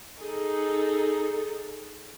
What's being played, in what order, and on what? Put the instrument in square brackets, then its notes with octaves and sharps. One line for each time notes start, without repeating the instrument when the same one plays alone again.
[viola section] D#4 A4 [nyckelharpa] G#4